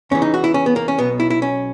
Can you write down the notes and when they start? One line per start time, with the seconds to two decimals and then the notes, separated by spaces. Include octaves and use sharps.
0.11 E2 C#3 E3 C#4
0.22 D#4
0.34 F#4
0.44 E4
0.54 C#4
0.66 B3
0.76 A#3
0.88 C#4
0.98 B1 B2 B3
1.20 E4
1.30 E4
1.42 C#4